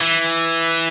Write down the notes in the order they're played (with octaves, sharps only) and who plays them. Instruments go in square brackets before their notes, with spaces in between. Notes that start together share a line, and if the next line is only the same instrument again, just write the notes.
[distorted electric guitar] E3